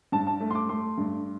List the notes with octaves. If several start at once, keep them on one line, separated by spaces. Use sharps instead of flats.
G2 A5
A5
A3
C6
D6
A3 C6
G2